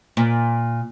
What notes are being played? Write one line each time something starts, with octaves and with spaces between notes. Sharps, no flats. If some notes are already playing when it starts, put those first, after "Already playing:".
A#2